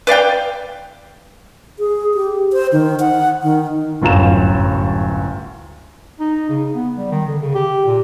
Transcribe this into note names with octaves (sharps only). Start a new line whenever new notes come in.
B4 D5 F5 G5
G#4
G4
C5
D#3
F#5
D#3
D1 G1 F#2 F5 A#5 E7
D#4
C#3
B3
G3
D#3
D3
C#3
G4
A#2